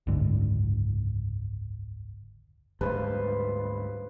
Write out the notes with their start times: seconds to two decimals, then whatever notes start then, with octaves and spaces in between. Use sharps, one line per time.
0.07 F#1 C#2 G#2 D3
2.81 D2 G#2 G3 B4 C5 F5